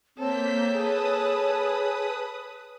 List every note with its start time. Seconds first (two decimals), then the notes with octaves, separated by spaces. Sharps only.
0.18 A#3 C4 A4 C#5 G6 B6
0.74 G#4 B4 D#6